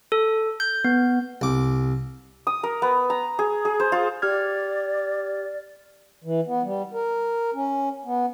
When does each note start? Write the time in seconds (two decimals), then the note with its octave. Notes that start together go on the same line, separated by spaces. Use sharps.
0.12 A4
0.60 G6
0.84 B3
1.41 C2 D6
2.47 D#6
2.63 A#4
2.82 B3
3.10 A#5
3.39 G#4
3.65 G#4
3.80 C5
3.92 F4
4.22 G4 D5 F6 G#6
6.24 E3
6.47 B3
6.63 G3
6.93 A#4
7.54 C#4
8.05 B3